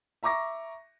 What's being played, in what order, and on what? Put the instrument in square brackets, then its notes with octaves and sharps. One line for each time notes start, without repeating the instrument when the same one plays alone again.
[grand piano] E5 A#5 C#6 D6 A#6